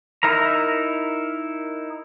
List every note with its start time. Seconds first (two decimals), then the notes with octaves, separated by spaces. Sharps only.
0.23 D#4 E4 A#4 A#5